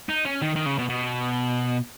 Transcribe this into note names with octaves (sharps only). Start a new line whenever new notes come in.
D#4
C#4
D#3
D#3
C#3
B2
B2